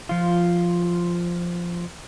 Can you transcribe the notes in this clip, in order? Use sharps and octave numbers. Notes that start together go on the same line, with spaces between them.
F3 F4